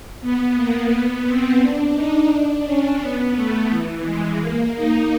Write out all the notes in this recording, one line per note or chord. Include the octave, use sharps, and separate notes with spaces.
B3
A#3
B3
C4
D4
D#4
D4
C#4
B3
A3
E3
G#3
A#3
D#4